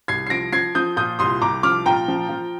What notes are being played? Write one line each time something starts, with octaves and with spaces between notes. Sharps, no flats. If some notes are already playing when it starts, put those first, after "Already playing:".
C2 G#6 C7
C7
F3 A#6 D7
F3 G#6 C7
F3 D#6 G6
A#2 D#6 G6
C2 C6 D#6
C2 A#5 D6
F3 D6 F6
A#2 G5 A#5
F3
F3